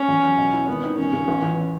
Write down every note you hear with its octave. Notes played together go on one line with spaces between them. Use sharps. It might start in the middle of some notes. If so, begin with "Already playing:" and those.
Already playing: C#4
E2
F#3
B2
E4
G#1 B3
D#3
E1 C#4
C#3
A1
E3